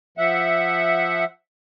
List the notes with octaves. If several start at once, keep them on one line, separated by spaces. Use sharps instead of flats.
F3 E5 F#5